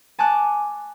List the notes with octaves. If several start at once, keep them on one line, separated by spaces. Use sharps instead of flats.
G#5 A5 C#6 D6 F#6